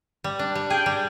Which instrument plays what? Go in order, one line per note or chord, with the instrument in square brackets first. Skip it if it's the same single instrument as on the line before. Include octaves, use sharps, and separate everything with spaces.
[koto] G3
D4
G3
[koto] G#4 [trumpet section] G5
[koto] G3